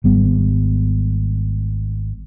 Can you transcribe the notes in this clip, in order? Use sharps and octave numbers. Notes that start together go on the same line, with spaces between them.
G#1 G3 B3